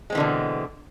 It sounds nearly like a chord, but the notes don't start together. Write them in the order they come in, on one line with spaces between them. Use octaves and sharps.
G#3 C4 E3 D3 B2